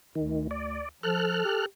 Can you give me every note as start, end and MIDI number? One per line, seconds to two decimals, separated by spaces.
0.15 0.86 38
0.15 0.47 51
0.51 0.89 74
1.03 1.44 53
1.03 1.66 69
1.03 1.66 89
1.03 1.66 90
1.45 1.65 67